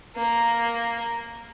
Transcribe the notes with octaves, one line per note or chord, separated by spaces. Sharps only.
A#3 A#4